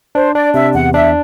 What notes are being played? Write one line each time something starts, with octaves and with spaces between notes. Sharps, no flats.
D4 C5
D4 D5
C3 E5
E2 F#5
D4 E5